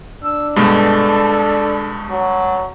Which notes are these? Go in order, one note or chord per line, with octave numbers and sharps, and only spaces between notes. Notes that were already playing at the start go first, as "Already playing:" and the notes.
D4 E6
G2 B2 G#3 A4
F#3